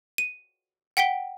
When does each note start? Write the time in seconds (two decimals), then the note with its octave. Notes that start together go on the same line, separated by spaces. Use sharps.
0.18 D#7
0.97 F#5 G5 B6 D7 G7